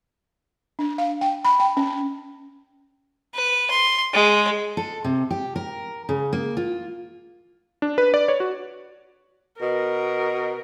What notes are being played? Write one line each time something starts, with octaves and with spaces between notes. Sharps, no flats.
D4
F5
G5
B5
G5
C#4
B4
C6
G#3
A4
C3
G4
A#4
C#3
A#3
F4
D4
B4
D5
C#5
F#4
B2 A#4